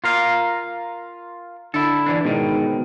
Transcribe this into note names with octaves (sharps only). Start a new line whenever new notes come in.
F4 A#4 F5
D3 E4 A4
E3 D4
G#2 B2 D#3